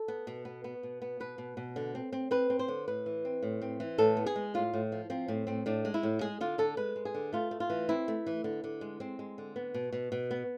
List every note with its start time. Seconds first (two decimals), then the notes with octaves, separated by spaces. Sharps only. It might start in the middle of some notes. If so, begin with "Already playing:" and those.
Already playing: A4
0.08 B3
0.27 B2
0.45 B3
0.64 B3
0.83 B2
1.02 B3
1.20 B2 B4
1.38 B2
1.57 B2
1.76 D3
1.95 C4
2.12 C4
2.31 C4 B4
2.50 C4
2.59 C5
2.68 D3
2.88 A2 B4
3.06 E3
3.25 C4
3.42 A2
3.62 C4
3.80 E3
3.98 A2 A4
4.17 B3
4.26 G#4
4.36 G#3
4.54 A2 F4
4.74 A2
4.92 F3
5.10 F3 C4
5.28 A2 C4
5.47 A2 C4
5.66 A2 D4
5.85 G#3
5.94 E4
6.03 A2
6.21 G#3 G#4
6.41 D3 F4
6.58 D3 A4
6.77 G#3 B4
6.96 G#3
7.05 G#4
7.14 D3
7.33 A3 F4
7.51 A3
7.60 F4
7.70 E3
7.89 C4 E4
8.08 A3
8.26 E3
8.44 D3
8.64 D3
8.81 G#3
9.00 G#3 C4
9.19 G#3
9.38 D3
9.56 B3
9.74 B2
9.92 B2
10.12 B2
10.31 B3